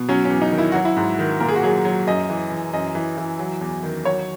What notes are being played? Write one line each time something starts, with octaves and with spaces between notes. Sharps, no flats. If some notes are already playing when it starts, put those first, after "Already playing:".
Already playing: B2
F#3 C#4
C#4
E2
D#4
D#3
E4
F#3 F#4
E4
G#2
D#3
A#2 A#4
G#4
F#4
F#3 G#4
F#3
F#2 D#5
E3
E3
F#2 D#5
E3
E3
F#3
E2
D#3
F#3 C#5